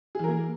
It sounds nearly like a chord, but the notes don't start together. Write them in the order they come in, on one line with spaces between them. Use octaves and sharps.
G#4 E3 A#4 A#3